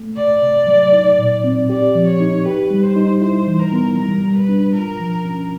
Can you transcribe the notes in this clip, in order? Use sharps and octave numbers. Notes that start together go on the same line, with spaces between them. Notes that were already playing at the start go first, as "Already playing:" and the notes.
Already playing: A3
C3 D5
C3
F#3
D#4
A#2
C4
G4 D5
F3
C#5
D#4
G4 B4
G3
C5
D#4
E4 C5
E3
A#4
B3
G3 A#4
G3
B4
D4
F4 A#4
F3
C#4